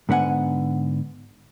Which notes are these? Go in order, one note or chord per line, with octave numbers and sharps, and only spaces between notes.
G#2 D3 B3 G4 F#5 G#5